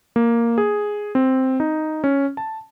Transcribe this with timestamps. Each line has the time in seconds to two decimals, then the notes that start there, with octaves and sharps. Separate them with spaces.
0.16 A#3
0.58 G#4
1.15 C4
1.60 D#4
2.04 C#4
2.37 A5